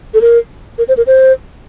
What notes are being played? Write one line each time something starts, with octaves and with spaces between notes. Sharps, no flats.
A4
A#4
A#4
C5
A#4
C5